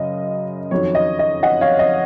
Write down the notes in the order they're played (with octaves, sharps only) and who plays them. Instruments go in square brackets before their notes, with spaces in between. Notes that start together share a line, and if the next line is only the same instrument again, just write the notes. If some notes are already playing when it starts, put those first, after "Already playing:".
Already playing: [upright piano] F#2 C#3 D#5
F2 D#3 F#3 C#5
D#5
D#5
D#5 F#5
C#5 F5
D#5